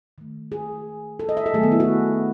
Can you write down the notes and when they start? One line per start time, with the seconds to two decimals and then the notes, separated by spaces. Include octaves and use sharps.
0.18 D#3 A3
0.52 G#4
1.19 A4
1.29 D#5
1.37 E5
1.46 A4
1.54 D#3 F#3 A3 G#4
1.63 B3
1.72 E4
1.80 F#4